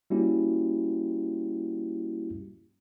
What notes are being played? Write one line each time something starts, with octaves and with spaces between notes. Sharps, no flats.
G3 A#3 C#4 E4 F#4 G4